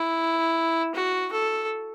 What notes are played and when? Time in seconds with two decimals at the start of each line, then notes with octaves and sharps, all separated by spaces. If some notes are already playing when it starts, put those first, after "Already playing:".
Already playing: E4
0.94 F#4
1.32 A4